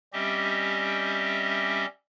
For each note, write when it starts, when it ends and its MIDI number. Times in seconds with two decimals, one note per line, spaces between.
0.13 1.86 55
0.13 1.86 60
0.13 1.86 61
0.13 1.86 67
0.13 1.86 75
0.13 1.86 76